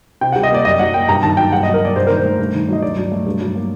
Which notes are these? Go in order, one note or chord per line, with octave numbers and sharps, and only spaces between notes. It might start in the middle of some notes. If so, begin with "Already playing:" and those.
C3 G5
G3 F#5
D#5
A#3 D5
F#2 D#5
F#3 F#5
A#3 G5
G2 A#5
D#3 A5
F#3 G5
G2 F#5
F#3 D#5
A#4
A#3 D5
G2 C5
D#3 A#4
C5
A3
G2
D#3
F#3 D#5
G2 D5
F#3
A3
G2
F#3
A#3